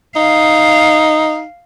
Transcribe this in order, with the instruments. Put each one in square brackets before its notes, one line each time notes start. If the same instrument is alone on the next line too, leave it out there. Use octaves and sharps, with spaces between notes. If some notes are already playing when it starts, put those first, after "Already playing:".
[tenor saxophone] D#4 [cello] F5